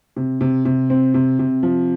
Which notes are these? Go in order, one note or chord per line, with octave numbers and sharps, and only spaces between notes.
C3
C3
C3
C4
C3
C3
F3